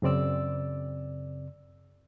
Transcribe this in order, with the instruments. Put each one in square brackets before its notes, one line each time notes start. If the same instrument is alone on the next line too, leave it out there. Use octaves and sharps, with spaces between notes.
[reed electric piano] F#2 C#3 C4 D5 E6